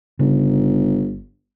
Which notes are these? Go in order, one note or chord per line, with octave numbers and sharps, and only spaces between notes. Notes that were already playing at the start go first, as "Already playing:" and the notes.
G1 C#3